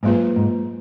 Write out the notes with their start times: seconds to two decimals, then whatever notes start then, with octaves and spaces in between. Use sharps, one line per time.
0.03 G#2 F#3 A#3 F4 B4
0.36 G#2